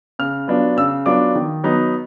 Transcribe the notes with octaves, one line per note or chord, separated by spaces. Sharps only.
C#3 F6
F#3 B3 D4 F4
C#3 E6
F#3 B3 D4 F4 D6
D#3
F#3 B3 D#4